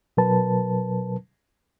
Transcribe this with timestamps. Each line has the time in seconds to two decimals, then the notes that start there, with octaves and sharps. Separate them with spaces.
0.17 B2 F#3 A#4 B4 A5